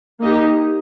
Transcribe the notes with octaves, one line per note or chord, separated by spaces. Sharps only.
A#3 D#4 G4 D#5